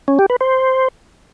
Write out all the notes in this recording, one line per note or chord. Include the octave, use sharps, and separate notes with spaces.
C#4
G4
B4
C5